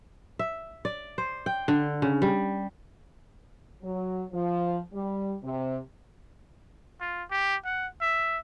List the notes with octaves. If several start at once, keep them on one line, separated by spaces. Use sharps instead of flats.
E5
D5
C5
G5
D3
C#3
G3
F#3
F3
G3
C3
F4
G4
F#5
E5